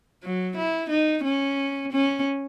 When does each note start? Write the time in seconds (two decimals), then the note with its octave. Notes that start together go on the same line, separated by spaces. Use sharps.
0.23 F#3
0.57 E4
0.90 D#4
1.24 C#4
1.92 C#4